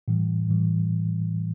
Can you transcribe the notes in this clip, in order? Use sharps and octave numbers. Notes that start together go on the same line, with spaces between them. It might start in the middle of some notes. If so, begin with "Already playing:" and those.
A2 E3 G3
A2 E3 G3